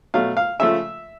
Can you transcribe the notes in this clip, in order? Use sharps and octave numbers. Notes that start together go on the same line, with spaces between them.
B2 F#3 A3 F5
F5
C#3 F3 A3 E5